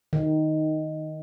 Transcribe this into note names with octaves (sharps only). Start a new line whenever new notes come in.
D#3